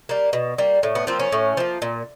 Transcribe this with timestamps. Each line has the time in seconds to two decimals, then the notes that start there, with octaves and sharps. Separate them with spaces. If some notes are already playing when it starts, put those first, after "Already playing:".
0.09 G3 A#3
0.33 B2
0.58 G3 A#3
0.83 A2
0.95 B3
1.07 F3 A#3 C4
1.20 C#4
1.32 A2
1.57 F3 A#3
1.82 A#2